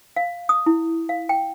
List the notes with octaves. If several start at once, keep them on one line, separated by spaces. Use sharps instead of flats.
F5
D#6
E4
F5
G5